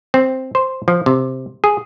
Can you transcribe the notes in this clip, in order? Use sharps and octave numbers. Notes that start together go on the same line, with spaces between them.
C4
C5
F3
C3
G#4